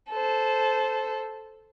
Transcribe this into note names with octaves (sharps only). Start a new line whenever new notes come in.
A4 C5